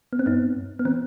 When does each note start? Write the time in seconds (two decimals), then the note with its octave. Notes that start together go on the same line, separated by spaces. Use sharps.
0.13 B3
0.19 C4
0.26 G2 B3 D#4
0.56 G2
0.79 B3
0.85 E3 C4